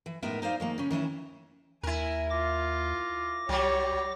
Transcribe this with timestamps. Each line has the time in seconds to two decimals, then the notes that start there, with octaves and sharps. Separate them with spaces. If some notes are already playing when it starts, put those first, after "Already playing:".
0.06 E3
0.22 A2 G#3 B3 D#4 A#4 E5
0.42 D#4 C5 D5 F5
0.60 D#3 G#3 A#3
0.78 C#3 C#4
0.91 D#3 E3 C#4 E4
1.83 D#2 E4 A#4 G#5
2.30 F4 D6 A#6
3.49 C2 F#3 G3 G4 C#5